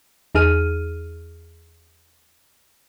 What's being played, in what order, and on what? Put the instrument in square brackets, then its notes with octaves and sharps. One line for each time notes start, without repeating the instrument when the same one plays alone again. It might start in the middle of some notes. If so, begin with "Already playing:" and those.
[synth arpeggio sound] E2 D#4 G#4 F6 D#7